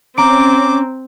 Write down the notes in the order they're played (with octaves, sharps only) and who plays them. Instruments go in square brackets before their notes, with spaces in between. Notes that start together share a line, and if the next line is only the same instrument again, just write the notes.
[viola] C4 [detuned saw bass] C#4 [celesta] A#5 D7 [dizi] D6